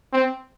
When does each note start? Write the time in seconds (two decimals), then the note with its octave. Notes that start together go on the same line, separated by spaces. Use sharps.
0.13 C4